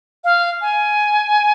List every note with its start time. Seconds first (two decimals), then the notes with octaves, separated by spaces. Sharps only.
0.24 F5
0.61 G#5